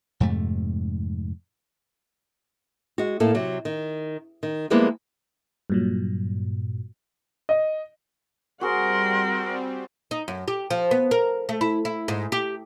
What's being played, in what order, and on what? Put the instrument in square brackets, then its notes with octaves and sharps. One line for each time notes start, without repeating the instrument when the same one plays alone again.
[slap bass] F2 G#2 C3 A3
[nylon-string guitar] G#3 F#4
A2 A#3 A4
C3 F#3
D#3
D#3
F3 G3 G#3 A#3 B3 E4
[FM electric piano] G2 A#2 F#3
[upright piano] D#5
[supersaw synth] G3 C4 [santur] F#4 G#4 C5 [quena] A#4 [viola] F#5 C6
[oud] D#4
F#2
G4
F3
B3
A#4
A3
E4
E4
G#2
G4